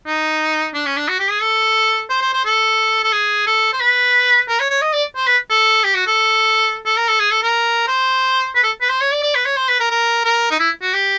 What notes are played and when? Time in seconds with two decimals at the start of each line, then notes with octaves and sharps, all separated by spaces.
0.06 D#4
0.74 D4
0.86 C#4
0.97 D4
1.08 F#4
1.19 G4
1.30 G#4
1.42 A4
2.10 C5
2.21 C5
2.33 C5
2.45 A4
3.04 A4
3.13 G#4
3.47 A4
3.73 C5
3.81 B4
4.48 A#4
4.60 C#5
4.70 C#5
4.82 D#5
4.93 D5
5.16 C5
5.27 B4
5.50 A4
5.84 G4
5.94 F#4
6.07 A4
6.86 A4
6.97 A#4
7.08 A4
7.20 G#4
7.31 A4
7.43 A#4
7.88 C5
8.55 B4
8.63 A4
8.81 B4
8.89 C5
9.01 C#5
9.12 D5
9.23 D5
9.35 B4
9.46 C#5
9.57 C5
9.69 B4
9.80 A#4
9.91 A#4
10.25 A#4
10.51 D#4
10.60 E4
10.82 F#4
10.94 G4